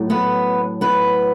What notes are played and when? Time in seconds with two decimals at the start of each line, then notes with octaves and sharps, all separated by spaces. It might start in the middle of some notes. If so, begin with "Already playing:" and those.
Already playing: A2 F#3
0.10 B3 B4
0.81 B3 B4